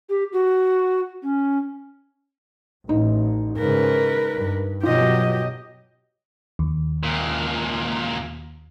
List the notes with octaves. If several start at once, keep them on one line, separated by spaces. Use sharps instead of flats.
G4
F#4
C#4
A1 D#4
G#2 C#3 A#4 B4
G2
B2 F#3 F4 G4 D#5
D#2
C#2 A#2